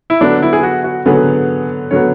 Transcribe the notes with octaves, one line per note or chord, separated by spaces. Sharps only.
E4
D3 F#3 B3 D4
E4
G#4
F#4
F#4
D3 F#3 B3 G#4
D3 F#3 B3 C#5